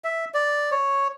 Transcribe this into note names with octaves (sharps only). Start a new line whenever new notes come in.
E5
D5
C#5